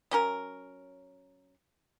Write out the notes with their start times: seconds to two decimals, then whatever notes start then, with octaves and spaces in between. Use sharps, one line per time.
0.11 F#3 C#4 A#4